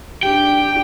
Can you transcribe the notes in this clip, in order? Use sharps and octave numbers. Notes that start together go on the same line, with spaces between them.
D4 G4 G5